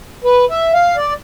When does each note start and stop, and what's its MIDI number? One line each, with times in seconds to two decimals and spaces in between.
0.24 0.45 71
0.51 0.73 76
0.74 0.96 77
0.97 1.14 74